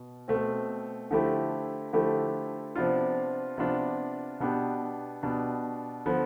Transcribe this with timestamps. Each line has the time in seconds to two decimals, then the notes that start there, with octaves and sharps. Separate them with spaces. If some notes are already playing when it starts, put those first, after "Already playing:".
Already playing: B2
0.28 B2 A3 C4
1.11 D3 F3 A3 E4 G4
1.93 D3 F3 A3 E4 G4
2.76 C3 F3 B3 D4 F4
3.58 C3 F3 B3 D4 F4
4.40 B2 B3 D4 G4
5.23 B2 B3 D4 G4
6.06 D3 F3 B3